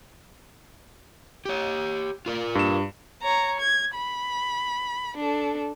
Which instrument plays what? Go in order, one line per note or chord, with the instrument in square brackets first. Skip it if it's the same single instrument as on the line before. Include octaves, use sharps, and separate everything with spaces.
[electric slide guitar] G4 C#5
F4 A#4 D5
[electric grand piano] G2 E7
[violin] C#5 A#5
G#6
B5
D4 A4